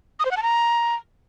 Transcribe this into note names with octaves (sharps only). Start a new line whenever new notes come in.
D#6
C5
F#5
A5
A#5